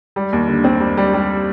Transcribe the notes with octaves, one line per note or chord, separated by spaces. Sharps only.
G3
D#2
D3
C4
G3
G3
G3